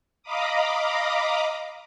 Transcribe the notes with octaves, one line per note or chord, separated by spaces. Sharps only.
D#5 F5 A#5 B5 D6 D#6